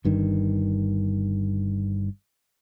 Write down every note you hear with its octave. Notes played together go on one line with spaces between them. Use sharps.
G1 G2 D#3